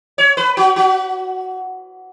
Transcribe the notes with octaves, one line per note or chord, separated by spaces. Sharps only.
C#5
B4
F#4
F#4